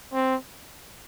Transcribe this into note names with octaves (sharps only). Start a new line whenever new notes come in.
C4